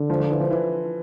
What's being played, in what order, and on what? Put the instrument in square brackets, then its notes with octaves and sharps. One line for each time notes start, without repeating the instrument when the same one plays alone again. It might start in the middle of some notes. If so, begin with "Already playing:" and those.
Already playing: [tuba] D3
[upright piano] F3
F3
E3
F3
E3